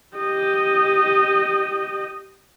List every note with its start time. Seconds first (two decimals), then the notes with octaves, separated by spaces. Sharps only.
0.17 G4 D#5